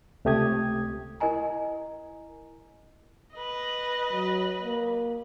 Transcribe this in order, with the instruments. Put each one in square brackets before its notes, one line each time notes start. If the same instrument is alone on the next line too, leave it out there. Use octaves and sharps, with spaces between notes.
[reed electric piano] C#2 C3 A3 G4 D#6 G#6
[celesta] E4 A#4 D#5 G#5 A#5
[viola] B4 D#5
[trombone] F#3
A#3